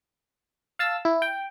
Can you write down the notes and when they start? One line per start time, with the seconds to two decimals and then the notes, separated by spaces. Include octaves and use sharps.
0.79 F5 A5 E6
1.05 E4
1.22 G5